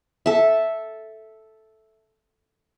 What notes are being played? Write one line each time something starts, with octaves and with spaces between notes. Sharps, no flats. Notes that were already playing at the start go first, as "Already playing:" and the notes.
A4 E5